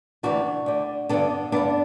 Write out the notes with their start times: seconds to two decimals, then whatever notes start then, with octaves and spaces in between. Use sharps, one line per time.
0.23 D2 C3 E3 D4 F#4
0.66 D2 D3
1.09 G2 D3 B3 D4
1.52 G2 D3 B3 D4